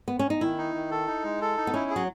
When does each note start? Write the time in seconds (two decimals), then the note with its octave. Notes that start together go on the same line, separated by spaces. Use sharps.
0.08 B3
0.19 C#4
0.30 D#4
0.41 D#3 E4
0.58 D#4
0.75 D#3
0.91 A4
1.07 D#4
1.24 G#3
1.42 A4
1.57 D#4
1.67 B3
1.74 C#4 E4
1.90 G#4
1.96 F#3